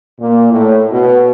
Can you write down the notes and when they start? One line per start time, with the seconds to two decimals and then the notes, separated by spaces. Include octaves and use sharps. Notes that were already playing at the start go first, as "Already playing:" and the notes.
0.20 A#2
0.51 A2
0.91 B2